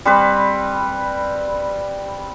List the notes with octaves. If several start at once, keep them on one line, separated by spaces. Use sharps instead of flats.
G3 C4 B4